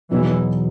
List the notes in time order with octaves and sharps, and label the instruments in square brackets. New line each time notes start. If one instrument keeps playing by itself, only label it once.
[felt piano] E2 B2 F#3 B3 D#4 [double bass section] E3